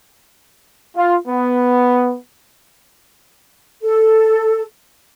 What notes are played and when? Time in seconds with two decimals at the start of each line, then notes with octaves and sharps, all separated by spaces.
0.97 F4
1.28 B3
3.82 A4